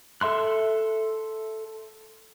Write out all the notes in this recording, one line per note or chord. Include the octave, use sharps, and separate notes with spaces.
A4 E5 C6 F#6